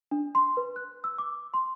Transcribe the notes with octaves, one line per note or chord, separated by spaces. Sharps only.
D4
C6
B4
F#6
E6
D6
C6